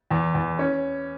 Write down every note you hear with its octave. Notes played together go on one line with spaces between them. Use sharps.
E2
E2
C#4